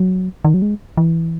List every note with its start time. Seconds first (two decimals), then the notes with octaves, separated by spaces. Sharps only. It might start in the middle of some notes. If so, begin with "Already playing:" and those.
Already playing: F#3
0.45 D#3
0.54 F#3
0.62 G#3
0.97 E3